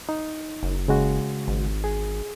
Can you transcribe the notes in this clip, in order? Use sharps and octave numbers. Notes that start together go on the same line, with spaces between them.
D#4
F#1
C#3 G#3 F#4
G#1
G#4